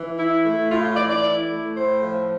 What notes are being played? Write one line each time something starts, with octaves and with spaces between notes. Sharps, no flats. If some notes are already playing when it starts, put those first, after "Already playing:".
Already playing: E3
E4
A3
A2 F4
F4
E3 D5
D5
E4
A3
A2 C5
F3